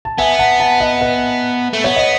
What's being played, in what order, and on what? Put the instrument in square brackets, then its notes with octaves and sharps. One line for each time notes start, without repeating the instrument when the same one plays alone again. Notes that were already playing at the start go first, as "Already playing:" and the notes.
[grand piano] A5
[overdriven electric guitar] B3 [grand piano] E5 G#5
[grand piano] F#5 A5
F#5 A5
D#5 F#5
B4 D#5
[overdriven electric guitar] A3
[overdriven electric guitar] B3 [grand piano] C#5
[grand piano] D#5